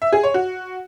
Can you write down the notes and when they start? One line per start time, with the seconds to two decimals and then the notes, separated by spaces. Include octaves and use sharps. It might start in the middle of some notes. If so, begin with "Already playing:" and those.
0.02 E5
0.13 G#4
0.23 C#5
0.34 F#4